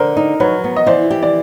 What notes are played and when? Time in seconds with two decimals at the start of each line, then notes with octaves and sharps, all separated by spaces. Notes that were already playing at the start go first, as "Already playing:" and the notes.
Already playing: D3 A#4 C5
0.17 D#4
0.40 F#3 B4 C#5
0.64 B3
0.76 D#5
0.86 E3 C5 D5
1.11 G4
1.23 D5